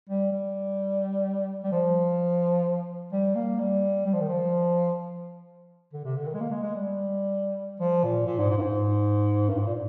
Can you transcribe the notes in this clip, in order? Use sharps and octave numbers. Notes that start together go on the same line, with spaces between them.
G3
G3
G3
F3
G3
A#3
G3
G3
F3
D#3
F3
D3
C3
D3
D#3
G#3
A#3
G#3
G#3
G3
F3
A#2
A#2
G#2
G#2
G2
G#2
G2
G#2
A#2